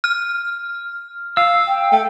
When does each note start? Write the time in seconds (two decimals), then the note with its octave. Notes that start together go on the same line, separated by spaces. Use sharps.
0.04 F6
1.37 F5 E6
1.68 G5
1.92 A3 G5